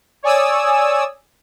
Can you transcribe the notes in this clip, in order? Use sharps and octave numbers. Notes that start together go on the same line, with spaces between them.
C#5 D5 G#5 D#6 E6